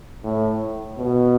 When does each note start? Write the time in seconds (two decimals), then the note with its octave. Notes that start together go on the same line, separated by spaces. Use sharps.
0.24 A2
0.98 B2